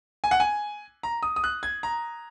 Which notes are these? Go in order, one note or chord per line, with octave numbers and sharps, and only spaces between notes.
G#5
F#5
G#5
A#5
D#6
D#6
F#6
G#6
A#5